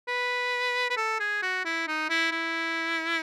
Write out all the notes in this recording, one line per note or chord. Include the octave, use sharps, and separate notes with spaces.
B4
B4
A4
G#4
F#4
E4
D#4
E4
E4